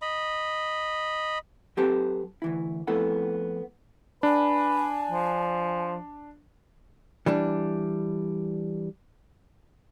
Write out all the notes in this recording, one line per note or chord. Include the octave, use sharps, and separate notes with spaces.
D#5 B5
F#3 C4 G4 A4 B4 C5
D2 E3 E4
F2 A3 B3 E4 A4 F#5
D4 B4 G#5
F3
E3 G3 D4